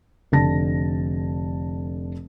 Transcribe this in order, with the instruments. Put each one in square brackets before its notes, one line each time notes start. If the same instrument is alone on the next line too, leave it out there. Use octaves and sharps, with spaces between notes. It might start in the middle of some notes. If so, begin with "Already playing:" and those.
[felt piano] F1 D3 A5 A#6